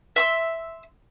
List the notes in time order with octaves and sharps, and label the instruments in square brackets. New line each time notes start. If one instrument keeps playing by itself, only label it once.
[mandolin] E5 C6 E6